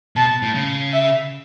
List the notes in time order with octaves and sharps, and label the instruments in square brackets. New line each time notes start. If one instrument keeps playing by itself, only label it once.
[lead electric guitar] B2 [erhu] A5
[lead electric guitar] A2
C#3
[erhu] E5